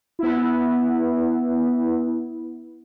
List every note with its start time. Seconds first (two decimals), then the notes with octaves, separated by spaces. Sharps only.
0.19 B3 E4